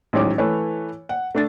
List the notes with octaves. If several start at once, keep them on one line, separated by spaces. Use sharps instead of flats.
A1 G#2 D#3 F#3 C#5 D6
E3 A3 B4 C#5
F#5
A3 D4 A6